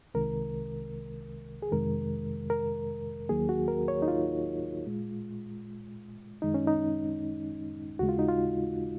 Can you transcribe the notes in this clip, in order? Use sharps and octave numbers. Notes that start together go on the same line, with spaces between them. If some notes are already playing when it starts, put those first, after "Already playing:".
C2 C3 D#3 G#3 A#4
G#4
F2 C3 D#3 G#3 A#4
A#4
D#2 D#3 F#3 A#3 G#4
F#4
A#4
C#5
D#4
F4
A#2 G#3
F#2 D#3 G#3 D#4
C#4
D#4
D#2 C#3 G#3 F#4
F4
D#4
F4